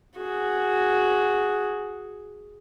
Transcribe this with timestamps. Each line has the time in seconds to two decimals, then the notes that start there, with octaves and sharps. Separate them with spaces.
0.17 F#4 G#4